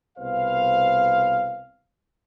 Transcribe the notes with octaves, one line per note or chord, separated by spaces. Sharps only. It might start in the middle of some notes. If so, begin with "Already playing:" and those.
C2 B2 B4 C5 F5